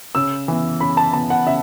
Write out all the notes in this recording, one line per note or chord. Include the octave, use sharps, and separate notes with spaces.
C#3 E6
E3 B3
C#3 B5
A5
E3 B3 A5
F#5
C#3 E5